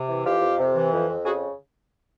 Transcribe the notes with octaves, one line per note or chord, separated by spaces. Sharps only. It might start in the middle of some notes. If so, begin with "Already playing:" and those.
Already playing: C3
E3
F2 F4 G4
F2
C3
E3
F2
F2
C#3 F#4 G#4